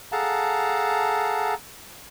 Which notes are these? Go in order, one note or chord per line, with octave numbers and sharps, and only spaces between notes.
G#4 A4 F5 F#5 A5 A#5